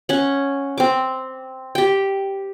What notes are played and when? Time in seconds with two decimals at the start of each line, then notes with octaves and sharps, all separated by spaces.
0.09 C#4 F#5
0.78 C4 D6
1.75 G4 G5